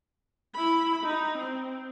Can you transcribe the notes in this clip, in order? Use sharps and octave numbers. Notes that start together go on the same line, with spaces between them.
E4 B5
D#4
C4